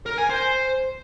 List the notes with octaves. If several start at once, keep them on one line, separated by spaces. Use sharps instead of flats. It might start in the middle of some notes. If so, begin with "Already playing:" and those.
A#4
G#5
C5